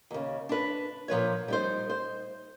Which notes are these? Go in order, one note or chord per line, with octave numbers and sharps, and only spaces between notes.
D#2 C#3
D4 B4
A#2 F3 B4 C#5
G3 D#4 C5
C5